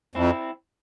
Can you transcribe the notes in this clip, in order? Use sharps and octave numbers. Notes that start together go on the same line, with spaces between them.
F2 C4 E4